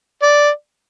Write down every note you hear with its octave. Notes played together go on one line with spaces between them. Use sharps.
D5